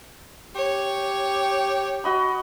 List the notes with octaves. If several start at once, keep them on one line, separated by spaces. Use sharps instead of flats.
G4 C#5
F#4 D#5 B5